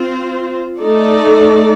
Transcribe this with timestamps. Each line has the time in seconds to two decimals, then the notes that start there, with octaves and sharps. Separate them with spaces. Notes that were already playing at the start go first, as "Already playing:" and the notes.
Already playing: C4 F4 C5
0.81 A3 D#4 A4 D5